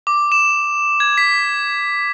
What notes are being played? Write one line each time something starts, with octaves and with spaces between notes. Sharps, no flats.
D6
E7
G#6
B6